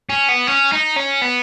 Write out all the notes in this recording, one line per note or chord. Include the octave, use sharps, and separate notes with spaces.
C#4
B3
C#4
D#4
C#4
B3